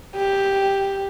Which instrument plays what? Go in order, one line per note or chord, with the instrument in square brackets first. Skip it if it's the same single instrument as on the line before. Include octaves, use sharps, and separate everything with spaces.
[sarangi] G4